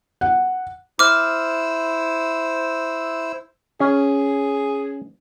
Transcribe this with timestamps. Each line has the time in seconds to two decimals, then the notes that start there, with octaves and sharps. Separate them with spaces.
0.21 F#5
0.99 E4 C5 D6 E6 F6
3.80 C#4 G#4